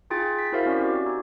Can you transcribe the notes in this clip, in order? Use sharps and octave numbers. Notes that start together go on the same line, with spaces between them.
D#4 F4 G#4 G5 A6
B6
E4 F#4 A#4 C5 E5 F5
C4 C#4 D5
F#4 G4
D#4